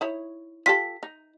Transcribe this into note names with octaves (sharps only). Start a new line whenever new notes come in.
D#4 E4 C#5
F4 G4 A4 B6
D#4